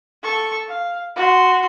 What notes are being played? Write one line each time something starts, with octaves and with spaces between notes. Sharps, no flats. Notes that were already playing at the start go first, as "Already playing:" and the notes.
A4 C#6
F5
F#4 C6